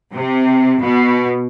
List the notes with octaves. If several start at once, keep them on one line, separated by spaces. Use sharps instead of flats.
C3
B2